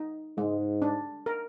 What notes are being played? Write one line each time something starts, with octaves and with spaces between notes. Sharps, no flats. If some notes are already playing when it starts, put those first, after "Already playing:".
Already playing: D#4
G#2 G#3
D4
A#4